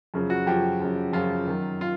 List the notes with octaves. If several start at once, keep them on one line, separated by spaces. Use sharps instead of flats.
F#2 C#3 F3
F#4
F#2 C#3 F3 G4
F#2 C#3 F3
F#2 C#3 F3 F4
F#2 D#3
F4